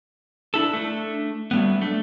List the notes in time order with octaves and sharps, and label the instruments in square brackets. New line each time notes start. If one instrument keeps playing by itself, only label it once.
[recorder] D4 [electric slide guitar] E4 A4
[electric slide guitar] A3
[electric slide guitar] F#3 G3 B3 [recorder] A3
[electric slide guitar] A3 [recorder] D4